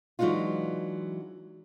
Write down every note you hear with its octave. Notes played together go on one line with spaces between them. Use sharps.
E3 F#3 G#3 D4 D#4 F4